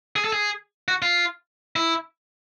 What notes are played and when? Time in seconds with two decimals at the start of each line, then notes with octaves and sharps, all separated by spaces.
0.16 G#4
0.24 A4
0.33 G#4
0.88 F#4
1.02 F4
1.76 E4